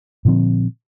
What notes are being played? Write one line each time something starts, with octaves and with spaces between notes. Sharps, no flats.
A#2 D3 F3 C4